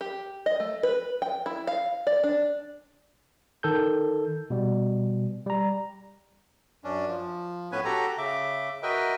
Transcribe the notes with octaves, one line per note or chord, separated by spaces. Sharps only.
G4
D#5
A3
B4
G5
E4
F5
D5
D4
D#3 A4 G6
B2 G3
G3 A#5
F#2 C#4 D4
F3
A2 B3 C#4 B4 G#5
F#4 G4 A4 A#5
C#3 E5 D6
F#4 A#4 B4 D#5 E5 G5